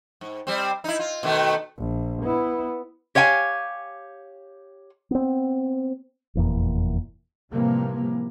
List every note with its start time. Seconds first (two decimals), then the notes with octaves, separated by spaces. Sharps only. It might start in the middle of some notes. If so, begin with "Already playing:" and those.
0.21 G#2
0.47 G3 C4
0.84 D#4 E4
0.99 F4
1.23 B2 D#3 A3
1.78 A#1
2.23 B3 E4
3.15 G4 C#5 F5 G5 G#5
5.11 B3 C4
6.35 F1 E2 A#2
7.50 A2 C3 E3 F3 G3 A#3